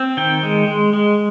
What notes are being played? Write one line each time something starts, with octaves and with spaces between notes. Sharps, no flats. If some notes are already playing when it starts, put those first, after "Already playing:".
Already playing: C4
D#3 G5
G#3
G#3
G#3